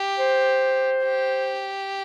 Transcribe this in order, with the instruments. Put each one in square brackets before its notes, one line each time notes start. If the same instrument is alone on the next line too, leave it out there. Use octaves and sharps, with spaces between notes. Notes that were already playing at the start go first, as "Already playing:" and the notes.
Already playing: [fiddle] G4
[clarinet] C5
[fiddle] G4